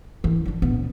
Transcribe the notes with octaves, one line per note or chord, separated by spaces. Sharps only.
E3
D3 F3
A#1 B3